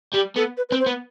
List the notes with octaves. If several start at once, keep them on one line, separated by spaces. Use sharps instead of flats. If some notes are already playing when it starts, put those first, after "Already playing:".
G3 G4
B3 A4
B4
B4
C4
C5
B3